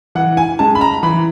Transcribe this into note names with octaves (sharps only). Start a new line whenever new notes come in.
E3 F#5
G#5
G#3 C#4 A5
B5
A#5
E3 B5